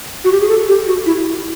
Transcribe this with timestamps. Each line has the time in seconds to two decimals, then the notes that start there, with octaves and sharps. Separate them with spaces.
0.24 F#4
0.32 G4
0.41 G#4
0.49 A4
0.68 G4
0.87 F#4
1.06 E4